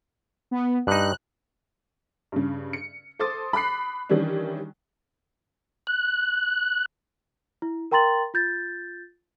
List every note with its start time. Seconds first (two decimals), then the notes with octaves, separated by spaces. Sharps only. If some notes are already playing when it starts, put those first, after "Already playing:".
0.51 B3
0.87 G2 D#4 F#6
2.32 G2 C#3
2.73 C#7
3.19 A4 C5 C6 D6 D#6 A6
3.53 B5 D6 F#6 C7
4.09 D#3 E3 G3 C#4 D4
5.87 F#6
7.62 E4
7.92 A#4 G5 A#5 C6 A6 F#7
8.34 F4 G6 A6